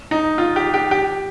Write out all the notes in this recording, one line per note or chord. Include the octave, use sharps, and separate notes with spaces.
D#4
F4
G4
G4
G4